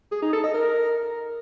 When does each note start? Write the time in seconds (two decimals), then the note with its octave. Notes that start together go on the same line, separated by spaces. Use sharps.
0.12 G#4
0.22 D#4
0.33 A4
0.43 D#5
0.54 A#4